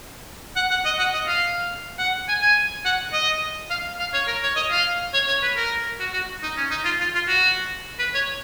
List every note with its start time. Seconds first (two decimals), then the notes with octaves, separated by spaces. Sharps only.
0.56 F#5
0.71 F#5
0.85 D#5
0.99 F#5
1.14 D#5
1.27 F5
1.99 F#5
2.28 G#5
2.41 G#5
2.85 F#5
3.13 D#5
3.70 F5
4.00 F5
4.13 C#5
4.27 A#4
4.43 C#5
4.56 D#5
4.71 F5
5.14 C#5
5.28 C#5
5.43 B4
5.57 A#4
6.00 F#4
6.13 F#4
6.43 D#4
6.57 C#4
6.71 D#4
6.85 F4
7.00 F4
7.14 F4
7.28 F#4
7.99 B4
8.15 C#5